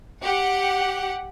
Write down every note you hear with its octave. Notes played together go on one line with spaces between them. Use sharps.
G4 F#5